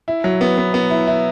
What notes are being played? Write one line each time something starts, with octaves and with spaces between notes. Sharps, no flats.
E4
F#3
B3
B3
B3
E4
E4